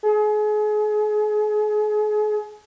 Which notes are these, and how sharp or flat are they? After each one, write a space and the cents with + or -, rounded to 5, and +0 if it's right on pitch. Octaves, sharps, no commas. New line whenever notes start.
G#4 +35